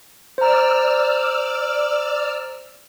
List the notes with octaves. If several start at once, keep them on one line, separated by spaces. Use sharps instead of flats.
C5 D5 A#5 E6 F6